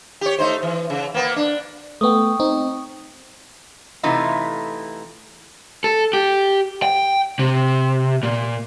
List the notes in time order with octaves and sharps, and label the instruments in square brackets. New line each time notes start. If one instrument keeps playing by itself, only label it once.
[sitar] G4 C#5
A3 D#4 C5
E3
C#3
A#3 B3
D4
[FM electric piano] A3 B3 [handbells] G5 C#6 D#6
[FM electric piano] C4 D#4
[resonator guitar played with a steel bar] C3 E3 A3 D#4 F4
[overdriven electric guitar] A4
G4
G5
C3
A#2